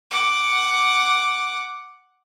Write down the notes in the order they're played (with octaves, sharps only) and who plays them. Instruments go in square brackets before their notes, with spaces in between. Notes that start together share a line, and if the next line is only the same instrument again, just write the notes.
[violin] F#5 D6